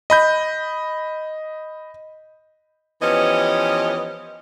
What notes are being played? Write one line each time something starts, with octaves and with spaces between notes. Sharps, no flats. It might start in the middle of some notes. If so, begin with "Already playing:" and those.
D#5 B5 G6
E3 F3 B3 C#4 G4 D#5